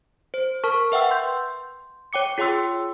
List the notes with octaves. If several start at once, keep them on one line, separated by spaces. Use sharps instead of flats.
C5
A#4 A5 C#6 F6
B4 E5 F#5 G5 E6
C6 G6
C#5 G5 D6 C#7
F4 G#4 C#5 G5 C6 E6